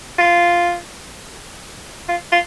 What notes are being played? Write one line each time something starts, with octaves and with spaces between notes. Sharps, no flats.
F4
F4
F4